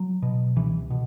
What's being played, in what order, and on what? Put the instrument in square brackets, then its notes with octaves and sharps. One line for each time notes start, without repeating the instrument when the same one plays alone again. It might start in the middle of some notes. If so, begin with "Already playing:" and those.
Already playing: [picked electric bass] F#3
B2
C#2 E3
B2